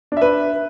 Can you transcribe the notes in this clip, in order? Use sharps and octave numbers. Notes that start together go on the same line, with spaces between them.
D4 B4 E5